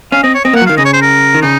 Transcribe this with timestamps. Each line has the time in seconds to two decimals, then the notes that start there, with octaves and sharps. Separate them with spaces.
0.12 C#4 F5
0.23 C4 D#5
0.34 C#5
0.45 C4 D#5
0.53 A#3 F#5
0.61 F#3
0.66 D#3 F5
0.78 C#3 D#5
0.85 C#5
0.93 C5
1.02 A#4
1.34 D#3
1.42 C#3 D#4